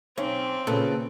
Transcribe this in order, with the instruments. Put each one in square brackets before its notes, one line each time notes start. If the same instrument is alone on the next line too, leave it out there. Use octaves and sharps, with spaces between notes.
[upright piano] B1 [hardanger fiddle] C4 [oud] C#4
[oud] A#2 [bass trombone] C#3 [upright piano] A4 B4